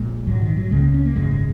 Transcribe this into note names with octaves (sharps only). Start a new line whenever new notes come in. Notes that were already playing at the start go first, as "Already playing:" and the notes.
Already playing: A#1 A#2 G#3
A#1 G#2 F#3
D#3
F#3
C#2 C#3 G#3
A#3
C#4
A#3
G#1 F#2 C#3 G#3
G#3